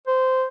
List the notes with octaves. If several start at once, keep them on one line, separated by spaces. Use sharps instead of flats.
C5